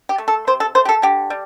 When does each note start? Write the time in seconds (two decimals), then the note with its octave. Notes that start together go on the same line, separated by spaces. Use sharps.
0.09 G4
0.18 A3
0.28 A4
0.47 C3 C5
0.60 A4
0.75 A3 C5
0.85 G4
0.89 A4
1.02 D3 G4
1.30 G3